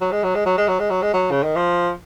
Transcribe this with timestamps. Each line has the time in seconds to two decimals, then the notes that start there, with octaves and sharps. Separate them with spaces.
0.01 F#3
0.12 G#3
0.24 F#3
0.35 G#3
0.46 F#3
0.58 G#3
0.68 F#3
0.79 G#3
0.90 F#3
1.02 G#3
1.13 F#3
1.31 C#3
1.43 D#3
1.56 F3